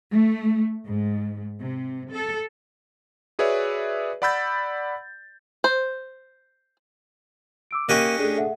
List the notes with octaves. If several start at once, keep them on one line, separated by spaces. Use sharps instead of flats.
A3
G#2
C3
A4
F#4 G#4 B4 C#5 D5 E5
D5 F#5 B5 E6 G6 A6
C5
D6 E6 D7
A#3 C#4 G4 D#5 F#6
A3 D4 G#4
A4 E5 F#5